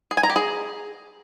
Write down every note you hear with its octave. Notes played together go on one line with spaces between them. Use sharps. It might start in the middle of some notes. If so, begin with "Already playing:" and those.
G#4
G#5
A#5
G4
G#4